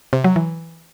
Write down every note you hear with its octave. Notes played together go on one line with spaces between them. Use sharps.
C3
F#3
E3